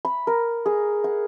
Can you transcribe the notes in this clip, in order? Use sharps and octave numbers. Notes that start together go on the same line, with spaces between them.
B5
A#4
G#4
F#5